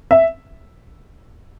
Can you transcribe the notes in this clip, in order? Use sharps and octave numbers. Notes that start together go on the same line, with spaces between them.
E5